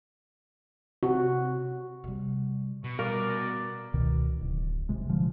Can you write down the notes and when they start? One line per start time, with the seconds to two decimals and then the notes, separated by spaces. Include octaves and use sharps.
1.03 C3 F#4
2.04 C3 G3
2.84 B2 C#6
2.99 G3 A#4 D5
3.94 C#2 B2 D#3
4.41 D1
4.89 F#1 C3 G#3
5.09 A#2 D3 F3 G#3